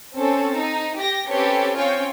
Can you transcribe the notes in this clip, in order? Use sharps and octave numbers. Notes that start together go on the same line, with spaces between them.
C4 C#4 A4
D#4
G4 A#6
C4 C#4 G4 A4 B4 C#5
C4 C#4 F4 C#5 G5 G#5